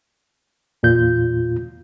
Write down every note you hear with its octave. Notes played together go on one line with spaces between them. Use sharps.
E2 A#2 F4 G6